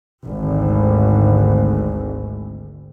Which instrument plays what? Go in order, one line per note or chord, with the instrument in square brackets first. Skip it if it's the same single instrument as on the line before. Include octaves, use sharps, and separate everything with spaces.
[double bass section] G#1 D2